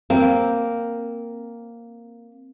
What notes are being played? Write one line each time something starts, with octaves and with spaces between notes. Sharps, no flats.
A#3 C4